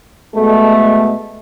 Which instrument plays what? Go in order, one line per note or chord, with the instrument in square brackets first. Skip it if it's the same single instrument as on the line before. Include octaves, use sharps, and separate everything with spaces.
[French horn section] B2 G#3 A3